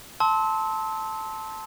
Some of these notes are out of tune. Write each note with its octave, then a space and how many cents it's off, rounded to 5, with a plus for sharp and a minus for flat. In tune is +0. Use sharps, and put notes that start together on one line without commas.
A5 +0 C6 +0 E6 -30